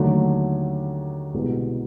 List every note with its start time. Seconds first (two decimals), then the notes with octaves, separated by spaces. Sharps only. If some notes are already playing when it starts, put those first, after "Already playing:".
Already playing: D#2 D3 F#3 A3
1.34 C2 B2 G#3 B3